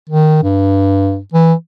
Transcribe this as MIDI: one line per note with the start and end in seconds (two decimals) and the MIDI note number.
0.09 0.38 51
0.43 1.19 43
1.33 1.54 52